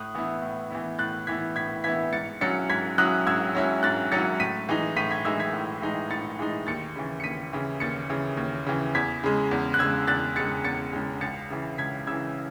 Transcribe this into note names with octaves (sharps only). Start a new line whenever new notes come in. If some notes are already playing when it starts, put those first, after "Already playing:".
Already playing: A2 D#6 F#6
E3 B3 E4
A2
E3 B3 E4
A2 F#6 A6
E3 B3 E4 G#6 B6
A2 G#6 B6
E3 B3 E4 G#6 B6
G#2 A6 C#7
F#3 C#4 E4 A6 C#7
G#2 G#6 B6
F#3 C#4 E4 D#6 F#6
G#2 E6 G#6
F#3 C#4 E4
G#2 F#6 A6
F#3 C#4 E4 A6 C#7
A2 B6 D#7
E3 G#3 D#4
A2 B6 D#7
G#6 B6
E3 G#3 D#4 E6 G#6
G#6 B6
A2
E3 G#3 D#4
A2 A6 C#7
E3 G#3 D#4
D#2 A6 C#7
C#3 E3
C#7
D#2 B6 D#7
C#3 E3
D#2 A6 C#7
C#3 E3
D#2
C#3 E3
E2 G#6 B6
C#3 G#3
E2
F#6
C#3 G#3 E6 G#6
E2 F#6 A6
C#3 G#3 A6 C#7
E2 A6 C#7
C#3 G#3
C#2 A6 C#7
C#3 E3
C#2 G#6 B6
C#3 E3 E6 G#6